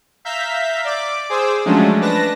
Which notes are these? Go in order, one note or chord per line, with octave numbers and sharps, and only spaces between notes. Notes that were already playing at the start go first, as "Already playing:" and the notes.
E5 F5 A#5 G6 B6
D5 D6
G#4 C5 D6 E6
F3 F#3 G#3 A3 C#4 D4
D4 B4 A5 A#6